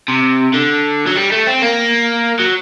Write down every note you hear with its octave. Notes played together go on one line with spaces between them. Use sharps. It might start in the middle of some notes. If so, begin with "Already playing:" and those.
C3
D3
F#3
G3
A3
C4
A#3
F#3